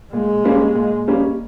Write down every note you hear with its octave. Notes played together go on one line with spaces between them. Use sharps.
A#2 G#3
G3 A#3 C#4
A#2
G3 A#3 C#4